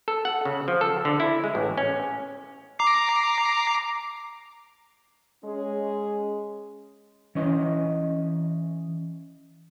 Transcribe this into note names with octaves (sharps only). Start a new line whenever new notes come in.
A4
F#5
C#3
F3
A4
D3
E4
G#3
A1
C#4
A#5 D6 C7
G#3 C#4 G#4
E3 C#4 D#5